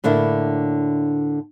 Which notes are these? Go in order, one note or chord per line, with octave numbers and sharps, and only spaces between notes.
A2 D3 A#3 D4 E4